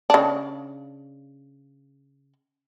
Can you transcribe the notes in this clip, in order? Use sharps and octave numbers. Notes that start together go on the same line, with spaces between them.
C#3 D4